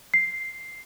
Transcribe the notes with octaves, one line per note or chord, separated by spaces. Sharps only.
C7